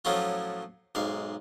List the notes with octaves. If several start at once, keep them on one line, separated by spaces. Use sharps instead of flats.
A2 F3 F#3 A3 C#4 F4
B1 G#2 F5